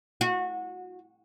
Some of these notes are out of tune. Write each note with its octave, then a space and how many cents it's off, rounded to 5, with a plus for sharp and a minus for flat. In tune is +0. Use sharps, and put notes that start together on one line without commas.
F#4 -25